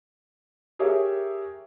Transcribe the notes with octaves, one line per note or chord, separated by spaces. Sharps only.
G4 G#4 A#4 C#5 E5